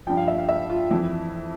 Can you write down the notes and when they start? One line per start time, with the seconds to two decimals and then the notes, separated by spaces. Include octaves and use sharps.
0.07 G2 F3 G5
0.17 F5
0.28 E5
0.38 F5
0.48 E5
0.70 F4
0.91 F2 E3 E4